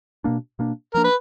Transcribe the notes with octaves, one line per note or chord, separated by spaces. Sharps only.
B2 A#3 D4
B2 A#3 D4
F3 A#3 D4 A#4
B4